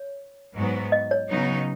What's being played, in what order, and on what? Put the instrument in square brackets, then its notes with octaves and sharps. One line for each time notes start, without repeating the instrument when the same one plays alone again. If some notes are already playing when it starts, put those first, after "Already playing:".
Already playing: [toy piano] C#5
[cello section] G#2 F#3 B3
[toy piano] D#5
C#5
[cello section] C#3 F#3 B3 D#4